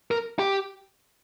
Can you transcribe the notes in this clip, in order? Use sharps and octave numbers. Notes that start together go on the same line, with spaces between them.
A#4
G4